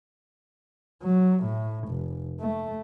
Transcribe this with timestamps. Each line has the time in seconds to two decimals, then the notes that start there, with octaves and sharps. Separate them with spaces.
1.03 F#3
1.44 A2
1.89 F1
2.41 A3